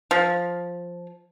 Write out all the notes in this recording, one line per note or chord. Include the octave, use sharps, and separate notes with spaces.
F3